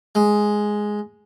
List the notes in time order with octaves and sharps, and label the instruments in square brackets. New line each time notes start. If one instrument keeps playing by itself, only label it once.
[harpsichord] G#3